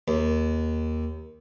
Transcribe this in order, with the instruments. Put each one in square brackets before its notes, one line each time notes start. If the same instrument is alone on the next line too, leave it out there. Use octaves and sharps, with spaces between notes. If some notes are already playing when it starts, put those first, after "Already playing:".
[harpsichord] D#2